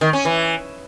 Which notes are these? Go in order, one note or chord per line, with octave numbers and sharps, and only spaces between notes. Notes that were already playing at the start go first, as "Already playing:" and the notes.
D#3
C#4
E3